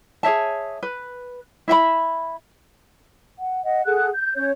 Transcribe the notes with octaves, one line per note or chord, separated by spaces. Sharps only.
G#4 C#5 E5 A5
B4
E4 E5 F#5 B5
F#5
D#5 F#5
G#4 A4 F#5 F#6
G6
C#4 C#5 G6